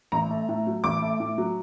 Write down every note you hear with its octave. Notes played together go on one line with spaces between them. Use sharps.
A1 A#5
A3
A2
F#3
A1 D6
A3
A2
F#3